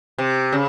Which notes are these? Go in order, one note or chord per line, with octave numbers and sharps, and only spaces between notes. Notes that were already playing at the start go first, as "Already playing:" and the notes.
C3
C#3